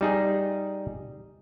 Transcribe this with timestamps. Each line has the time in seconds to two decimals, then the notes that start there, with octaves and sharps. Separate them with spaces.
0.01 G3 D#4 G#4